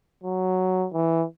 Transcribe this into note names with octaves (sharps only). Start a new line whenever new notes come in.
F#3
E3